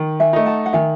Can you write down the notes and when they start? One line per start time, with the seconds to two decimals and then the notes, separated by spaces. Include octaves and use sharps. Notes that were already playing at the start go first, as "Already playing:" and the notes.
Already playing: D#3
0.20 E5 G#5
0.33 A3 D#4
0.46 F#5 A5
0.66 F#5
0.73 D#3 E5 G#5